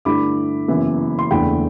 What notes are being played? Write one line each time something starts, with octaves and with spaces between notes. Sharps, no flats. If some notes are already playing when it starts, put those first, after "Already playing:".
G2 D3 A3 E4 B5 D6
F#1 F#2 E3 B3 E4
C6
F#1 E2 D3 A3 G5 B5